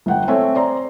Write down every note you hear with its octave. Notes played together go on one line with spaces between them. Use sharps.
G1 F#5 G5
A3 C4 C#5 E5 G#5
C5 D5 A#5 C6